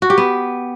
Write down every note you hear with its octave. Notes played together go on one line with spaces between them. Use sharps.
F#4
G4
B3